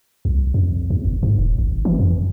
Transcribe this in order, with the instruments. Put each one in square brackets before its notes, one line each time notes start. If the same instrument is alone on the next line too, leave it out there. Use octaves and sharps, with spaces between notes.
[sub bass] C2
F2
E2
G1
G#2
D#1
G#1
E3
F2